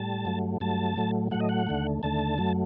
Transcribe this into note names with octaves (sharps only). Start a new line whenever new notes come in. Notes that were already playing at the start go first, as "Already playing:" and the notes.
Already playing: A2 G3 A5
G2 F#3 A3
G2 F#3 A3 A5
A2 F#3 A3
A2 F#3 A3 F#5
D#5
F#5
D#2 D3 A3
D#2 D3 A3 A5
F#2 F#3 A3